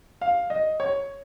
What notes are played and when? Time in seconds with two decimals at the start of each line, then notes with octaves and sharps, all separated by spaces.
0.21 F5
0.50 D#5
0.80 C#5